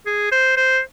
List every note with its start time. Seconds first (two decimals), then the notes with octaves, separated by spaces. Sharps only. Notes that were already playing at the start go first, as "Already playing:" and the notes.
0.06 G#4
0.31 C5
0.57 C5